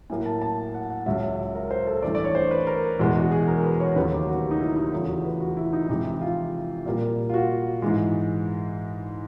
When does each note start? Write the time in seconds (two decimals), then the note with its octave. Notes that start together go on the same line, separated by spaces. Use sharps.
0.10 A2 F#3 A#3 G#5
0.26 A5
0.42 A5
0.74 F#5
0.90 F#5
1.06 C#2 C#3 F#3 E5
1.31 E5
1.55 A#4
1.71 C5
1.87 A4
2.02 G2 E3 A3 D5
2.15 D5
2.24 C#5
2.35 C5
2.51 B4
2.67 A#4
2.99 E2 B2 G#3
3.16 F#4
3.32 G#4
3.48 A#4
3.64 B4
3.80 C#5
3.96 D#2 C#3 F#3 A3 B4
4.12 G4
4.28 F#4
4.51 D#4
4.60 E4
4.76 D#4
4.92 E2 C#3 F3 A3 E4
5.09 F#4
5.24 B4
5.40 F#4
5.57 E4
5.73 D#4
5.89 F2 C3 E3 G#3 D#4
6.05 E4
6.21 F4
6.86 A#2 G3 A#3
7.30 F4
7.34 F#4
7.82 G#2 E3 G#3